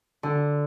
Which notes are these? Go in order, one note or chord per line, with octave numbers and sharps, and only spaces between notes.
D3